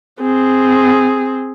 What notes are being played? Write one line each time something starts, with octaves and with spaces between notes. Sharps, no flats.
C4 G#4